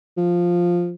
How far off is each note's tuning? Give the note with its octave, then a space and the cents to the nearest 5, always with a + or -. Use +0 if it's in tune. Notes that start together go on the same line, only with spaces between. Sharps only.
F3 +5